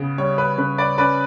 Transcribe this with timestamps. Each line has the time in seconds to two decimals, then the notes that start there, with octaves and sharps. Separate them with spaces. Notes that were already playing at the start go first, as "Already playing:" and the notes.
Already playing: C#3 B3
0.18 G3 C#5
0.38 B4
0.58 C#3 B4
0.78 B4 D5
0.98 C#4 B4 D5